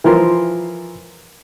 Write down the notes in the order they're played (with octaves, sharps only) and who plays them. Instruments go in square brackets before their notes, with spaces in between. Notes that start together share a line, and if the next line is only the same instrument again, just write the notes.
[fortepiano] E3 F3 A#4 C6